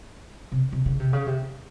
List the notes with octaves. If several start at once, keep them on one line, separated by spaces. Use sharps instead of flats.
C3
C3
C#3
C3
C#3
C3